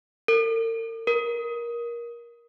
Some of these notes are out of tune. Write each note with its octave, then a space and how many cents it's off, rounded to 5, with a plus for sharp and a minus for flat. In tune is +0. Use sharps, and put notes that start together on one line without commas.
A#4 -45
A#4 +20